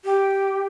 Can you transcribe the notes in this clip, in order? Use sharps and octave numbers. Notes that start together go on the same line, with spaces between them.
G4